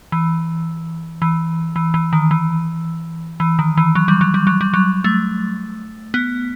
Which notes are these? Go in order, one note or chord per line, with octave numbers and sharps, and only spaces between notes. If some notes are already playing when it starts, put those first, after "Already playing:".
E3
E3
E3
E3
D#3
E3
E3
D#3
E3
F#3
G3
F#3
G3
F#3
G3
F#3
A3
B3